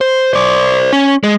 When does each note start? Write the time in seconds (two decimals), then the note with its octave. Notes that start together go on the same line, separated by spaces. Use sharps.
0.01 C5
0.33 C5 D5
0.92 C#4
1.24 G#3